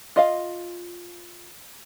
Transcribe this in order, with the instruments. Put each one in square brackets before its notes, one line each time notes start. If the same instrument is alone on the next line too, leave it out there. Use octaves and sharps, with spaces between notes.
[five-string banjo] F4 D#5 F5